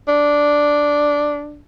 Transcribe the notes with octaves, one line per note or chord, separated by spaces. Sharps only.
D4